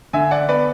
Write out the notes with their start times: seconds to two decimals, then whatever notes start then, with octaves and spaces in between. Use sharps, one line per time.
0.13 D3 E5 G#5
0.31 D5 F#5
0.49 B3 B4 D5